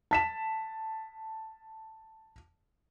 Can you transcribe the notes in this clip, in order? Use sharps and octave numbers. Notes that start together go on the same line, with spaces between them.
A5 B6 E7